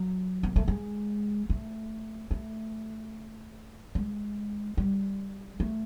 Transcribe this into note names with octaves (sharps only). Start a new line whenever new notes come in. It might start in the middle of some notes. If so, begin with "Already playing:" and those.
Already playing: F#3
A#3
A3
G#3
A3
A3
G#3
G3
A3